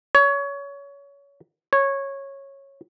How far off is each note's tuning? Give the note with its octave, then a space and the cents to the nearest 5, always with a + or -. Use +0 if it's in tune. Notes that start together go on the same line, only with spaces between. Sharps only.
C#5 +20
C#5 -15